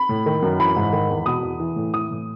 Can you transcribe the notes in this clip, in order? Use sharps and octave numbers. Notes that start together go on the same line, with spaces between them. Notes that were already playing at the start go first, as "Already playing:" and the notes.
Already playing: B5
A2
D#3
F#2
E3 B5
G#2
D#3
E2
B2 D#6
E2
E3
A2
E3 D#6
A2